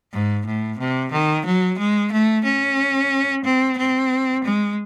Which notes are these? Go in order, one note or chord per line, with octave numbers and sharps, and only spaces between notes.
G#2
A2
C3
D#3
F#3
G#3
A3
C#4
C4
C4
G#3